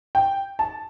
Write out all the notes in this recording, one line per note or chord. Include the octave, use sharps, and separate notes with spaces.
G5
A5